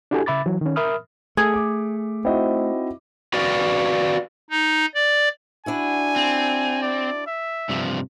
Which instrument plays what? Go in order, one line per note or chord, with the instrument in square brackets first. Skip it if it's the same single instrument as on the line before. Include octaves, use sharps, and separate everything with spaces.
[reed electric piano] D4 E4 F#4 G4 A4 G#5
C#3 E5 B5 D6 A6
E3 F#3
D#3 C#4
A#4 E5 B5 D#6 F6
[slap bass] A3 [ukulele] G#4 [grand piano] A4 [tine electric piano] G#5
[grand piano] D6
[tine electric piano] C4 D#4 F#4 [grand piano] E4 C5 D#5
[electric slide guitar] F#4 B4 D5 F5
[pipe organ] D#4
D5
[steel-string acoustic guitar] D4 E4 F#4 [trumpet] G#5
[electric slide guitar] C4
[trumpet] D5
E5
[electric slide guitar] G2 C3 F3